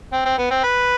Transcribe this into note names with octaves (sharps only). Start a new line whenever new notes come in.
C4
C4
B3
C4
B4